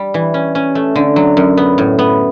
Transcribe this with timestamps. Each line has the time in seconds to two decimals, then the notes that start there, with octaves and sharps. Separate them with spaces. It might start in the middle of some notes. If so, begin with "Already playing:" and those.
Already playing: G3
0.14 E3
0.34 C#4
0.55 C#4
0.75 A3
0.96 D3
1.16 F#3
1.37 F#2
1.57 B3
1.78 A2
1.99 B3